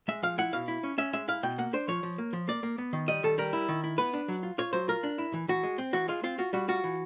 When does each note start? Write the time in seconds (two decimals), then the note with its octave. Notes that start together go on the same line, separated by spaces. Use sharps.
0.08 G#3 E5
0.23 F3 F5
0.38 E4 F#5
0.53 B2 F5
0.68 E4
0.83 C#4
0.98 C#4 E5
1.13 G#3 E5
1.28 E4 F5
1.43 B2 G5
1.58 A#3 F#5
1.73 D4 C5
1.88 F3 C#5
2.03 F3
2.18 A#3
2.33 F3
2.48 A#3 D5
2.63 A#3
2.78 B3
2.93 D#3
3.08 G3 D#5
3.23 D#3 A4
3.38 G3 A#4
3.53 E4
3.69 D#3
3.84 E4
3.98 B3 B4
4.13 D4
4.28 F#3
4.43 F4
4.58 F4 C#5
4.73 F#3 C5
4.88 F4 A#4
5.03 D4
5.18 E4
5.34 E3
5.48 E3 F#4
5.63 G#3
5.78 C4
5.93 E3 F#4
6.08 G#3 F4
6.23 C4 F4
6.38 F4 F#4
6.53 G3 F#4
6.68 F4 F#4
6.84 E3